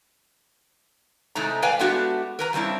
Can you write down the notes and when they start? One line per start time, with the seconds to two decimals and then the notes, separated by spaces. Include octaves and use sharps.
1.35 A2 C3 G#3 A3 D#4 A#5
1.62 B4 D5 F5 G5 G#5
1.79 G#3 A3 B3 D4 F#4 G4
2.39 A#4 B4 A#5
2.53 C#3 G3 C4 D4 E4